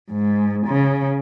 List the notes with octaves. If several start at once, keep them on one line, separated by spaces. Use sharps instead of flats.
G#2
C#3